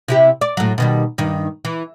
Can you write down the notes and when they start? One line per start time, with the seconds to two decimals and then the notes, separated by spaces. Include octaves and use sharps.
0.08 C3 E4 G4
0.41 D5
0.57 A2 F#3
0.78 B2 D#3 G3
1.18 G2 D#3
1.65 E3